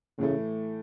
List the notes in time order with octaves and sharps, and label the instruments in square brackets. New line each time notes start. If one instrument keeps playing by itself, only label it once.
[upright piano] A2 E3 A3 [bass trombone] C#3